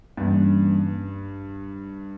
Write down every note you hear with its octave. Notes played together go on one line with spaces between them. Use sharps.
G2 E3 G3 A#3 C#4